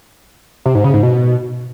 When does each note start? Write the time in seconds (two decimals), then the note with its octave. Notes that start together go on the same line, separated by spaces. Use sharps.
0.66 C3
0.75 G#2
0.84 C#3
0.94 G#2
1.03 B2